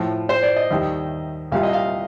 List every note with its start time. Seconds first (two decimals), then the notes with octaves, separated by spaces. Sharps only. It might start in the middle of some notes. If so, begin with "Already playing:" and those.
Already playing: A2 F3
0.29 C5
0.43 D5
0.56 D#5
0.71 D#2 D#3 G3
1.52 C2 A#2 G3 F5
1.63 D#5
1.73 F5